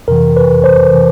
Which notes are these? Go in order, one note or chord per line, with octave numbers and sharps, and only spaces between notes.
F2 C3 E3 A#4
B4
C5
C3 E3